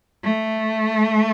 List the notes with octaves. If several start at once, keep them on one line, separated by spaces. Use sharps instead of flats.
A3